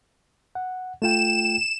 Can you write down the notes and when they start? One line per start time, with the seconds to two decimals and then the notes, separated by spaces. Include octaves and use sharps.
0.55 F#5
1.02 A3 F4 G5 E7